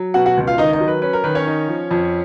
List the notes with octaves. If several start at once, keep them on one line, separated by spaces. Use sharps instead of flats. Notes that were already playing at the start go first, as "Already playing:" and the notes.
Already playing: F#3
B2 F#4 F#5
F#4 F#5
C#2
F4 F5
D#3 D#4 D#5
D#4 D#5
F#3
B4
C#4 B4
A#4
D#3 B4
C#4 C#5
D#4
F3
F2